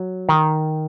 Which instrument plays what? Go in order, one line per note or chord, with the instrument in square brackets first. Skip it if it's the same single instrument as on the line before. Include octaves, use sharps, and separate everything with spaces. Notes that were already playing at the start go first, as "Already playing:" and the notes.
Already playing: [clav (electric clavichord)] F#3
D#3